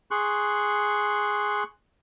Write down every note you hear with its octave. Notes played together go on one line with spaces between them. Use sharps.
G#4 C6 C#6 F#6